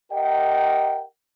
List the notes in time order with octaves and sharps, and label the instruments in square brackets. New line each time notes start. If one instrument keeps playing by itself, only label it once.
[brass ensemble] G4 A#4 D#5 F#5 G5